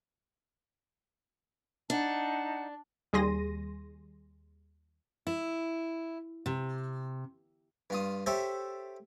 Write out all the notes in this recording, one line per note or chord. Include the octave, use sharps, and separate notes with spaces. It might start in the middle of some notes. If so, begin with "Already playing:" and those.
D4 D#4 F#5 A5
D#2 G3 G#4 C6 A#6 D#7
E4
C3
G2 F4 D#6
G4 A4 C5 C#5 E5